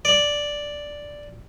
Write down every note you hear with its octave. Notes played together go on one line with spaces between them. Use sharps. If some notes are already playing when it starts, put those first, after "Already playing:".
D5